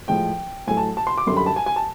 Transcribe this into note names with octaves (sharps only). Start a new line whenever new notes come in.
A2 F3 G#3 G5
A2 F#3 A3 G#5
A5
A5
C6
D6
F#2 D3 G3 C6
B5
A5
G#5
G#5
A5